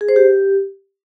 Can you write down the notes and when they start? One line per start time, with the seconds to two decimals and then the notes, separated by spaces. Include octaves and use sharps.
0.01 G#4
0.09 C5
0.16 G4